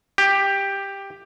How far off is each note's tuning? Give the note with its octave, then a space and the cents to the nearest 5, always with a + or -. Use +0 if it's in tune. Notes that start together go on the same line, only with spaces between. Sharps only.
G4 +10